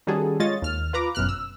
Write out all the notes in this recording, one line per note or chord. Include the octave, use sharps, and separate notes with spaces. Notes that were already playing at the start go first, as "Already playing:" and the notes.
D#3 G3 C#4 F#4 G#4 A4
G#3 F4 C#5 D#5 A6
D#2 F6
F4 B4 A#5 D6
G1 F#2 B2 F6 F#6
E6